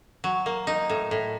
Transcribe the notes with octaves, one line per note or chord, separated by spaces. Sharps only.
F#3
A#3
D#4
A2
A2